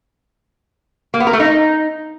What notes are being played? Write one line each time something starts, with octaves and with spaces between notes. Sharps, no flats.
A#3
B3
A#4
A3
D#4